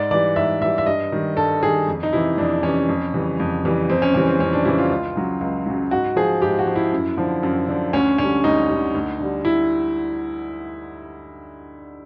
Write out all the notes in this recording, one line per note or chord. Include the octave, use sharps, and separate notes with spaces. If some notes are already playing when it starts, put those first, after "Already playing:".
Already playing: G#2 D5
E3 G3 D5
G#2 E5
E3 G3 E5
E5
G2 D#5
D#3 G3
G2 A4
D#3 G3 G#4
F2
D#4
C3 E3 E4
F2 D4
C3 E3 C#4
F2
C#3 E3 G3
F2
C#3 E3 G3
F2 C4
C#4
C#3 E3 G3 C#4
C4
F2 C#4
D4
C#3 E3 G3 E4
F4
C#2
C#3 F#3
C#2
C#3 F#3
G#2 F#4
F3 G#4
G#2 G4
F#4
F3
E4
F#2
D3 F3
F#2
D3 F3
D2 C#4
D3 G3 C#4
D2 D#4
D3 G3
D2
D3 G3
E4